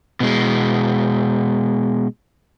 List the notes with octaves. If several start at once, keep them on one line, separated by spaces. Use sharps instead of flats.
B2 G#3